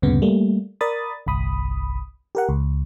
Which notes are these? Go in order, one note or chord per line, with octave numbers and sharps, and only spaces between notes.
D2 G2 A#2 C#3 B3
G3 A3 A#3
A#4 D5 B5 D#6 A6
G1 C2 B5 D#6
G4 A#4 F#5
C#2